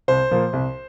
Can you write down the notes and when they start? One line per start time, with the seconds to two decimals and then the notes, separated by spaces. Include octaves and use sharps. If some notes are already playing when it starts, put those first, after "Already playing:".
0.08 C2 C5
0.31 A#2 F3 A#3
0.53 C2